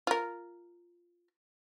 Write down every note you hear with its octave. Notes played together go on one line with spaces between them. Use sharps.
F4 A#4